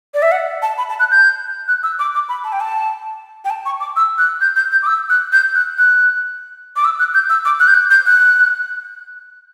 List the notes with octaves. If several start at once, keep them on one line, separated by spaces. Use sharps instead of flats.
D5
E5
F#5
A5
B5
A5
F#6
G6
F#6
E6
D6
D6
B5
A5
G5
A5
G5
A5
C#6
D6
E6
F#6
G6
G6
G6
D6
E6
F#6
G6
F#6
F#6
D6
E6
F#6
G6
E6
D6
F#6
G6
F#6
G6
F#6